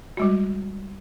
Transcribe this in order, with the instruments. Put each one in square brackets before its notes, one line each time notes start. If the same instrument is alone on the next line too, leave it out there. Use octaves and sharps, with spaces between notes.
[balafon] G3 G#3 F#4